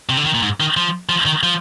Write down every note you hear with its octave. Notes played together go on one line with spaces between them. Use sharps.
C3
D3
D#3
A#2
G#2
D#3
F3
F3
D#3
F3